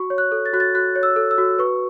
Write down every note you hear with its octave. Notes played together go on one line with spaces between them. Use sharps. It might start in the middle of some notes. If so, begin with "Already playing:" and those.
Already playing: F#4 C#6
C#5
F#6
A4
A6
F#4 F#6
A6
F#4 F#6
C#5
E6
A4
E6
F#4
B4 C#6